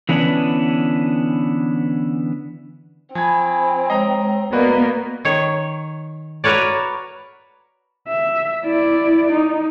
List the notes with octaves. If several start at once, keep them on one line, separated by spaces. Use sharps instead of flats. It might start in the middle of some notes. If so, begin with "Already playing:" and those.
D3 E3 B3 C#4 D4
F3 C4 G#5 B5 G#6
G#3 C#5 D#5 G5 A#5
A#3 B3 F#4 B4 D5 D#5
D#3 C#5
F#4 A#4 B4 C#5 D5
E5
E4 D5
D#4